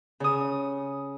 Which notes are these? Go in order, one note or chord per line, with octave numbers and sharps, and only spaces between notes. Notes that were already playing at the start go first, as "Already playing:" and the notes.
C#3 D#6